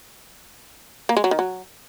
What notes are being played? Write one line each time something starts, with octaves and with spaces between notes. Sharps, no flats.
A#3
G#3
F#3
D#3
F#3